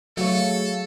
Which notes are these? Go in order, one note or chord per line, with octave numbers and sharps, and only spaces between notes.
F#3 A3 G#4 A4 C#5 F5